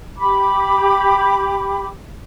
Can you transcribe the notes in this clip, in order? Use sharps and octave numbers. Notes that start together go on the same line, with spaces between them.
G4 B5 D6